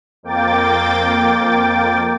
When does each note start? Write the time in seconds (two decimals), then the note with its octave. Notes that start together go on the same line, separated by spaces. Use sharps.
0.23 F2 A#3 G5 D6 A6